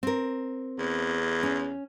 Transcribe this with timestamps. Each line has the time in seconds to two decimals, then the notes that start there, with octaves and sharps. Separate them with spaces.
0.03 C4 A#4
0.78 E2
1.43 C#4